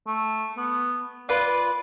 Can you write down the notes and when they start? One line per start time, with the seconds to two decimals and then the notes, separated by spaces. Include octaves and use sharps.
0.07 A3
0.57 B3
1.29 F4 B4 D5